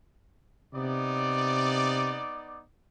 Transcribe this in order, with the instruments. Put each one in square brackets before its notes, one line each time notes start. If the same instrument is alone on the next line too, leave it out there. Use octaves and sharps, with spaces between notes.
[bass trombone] C3 [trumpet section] B3 D#4 D5